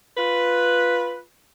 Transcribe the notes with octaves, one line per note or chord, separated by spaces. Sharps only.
F4 B4